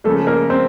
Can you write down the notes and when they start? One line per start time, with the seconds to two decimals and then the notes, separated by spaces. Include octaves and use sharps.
0.04 C#3 F3 A3 A#3 A4
0.27 A#3 A#4
0.50 C4 C5